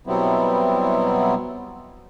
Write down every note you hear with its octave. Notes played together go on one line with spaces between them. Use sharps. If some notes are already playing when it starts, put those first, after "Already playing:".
B2 F#3 G3 B3 C4 E4